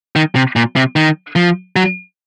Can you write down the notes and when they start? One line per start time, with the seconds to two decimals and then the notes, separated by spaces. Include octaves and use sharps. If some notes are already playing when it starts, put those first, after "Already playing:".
0.16 D#3
0.35 C3
0.56 A#2
0.76 C3
0.96 D#3
1.36 F3
1.76 F#3